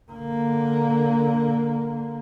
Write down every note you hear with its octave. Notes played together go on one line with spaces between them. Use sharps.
D3 A#3